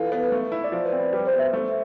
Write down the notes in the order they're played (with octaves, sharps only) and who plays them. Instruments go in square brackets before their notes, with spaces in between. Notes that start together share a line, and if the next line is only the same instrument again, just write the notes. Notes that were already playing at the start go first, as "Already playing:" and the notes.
Already playing: [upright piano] E3 F4 [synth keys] A4 B4
[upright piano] B3
A3
E4
[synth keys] D5
[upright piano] F3 [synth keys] C5
[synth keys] B4
[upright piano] C4
[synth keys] B4
[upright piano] G3 [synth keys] B4
[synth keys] C5
[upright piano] B3
[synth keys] E5
[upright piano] A3